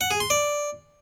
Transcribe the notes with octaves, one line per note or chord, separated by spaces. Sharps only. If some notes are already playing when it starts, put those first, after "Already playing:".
F#5
G#4
C6
D5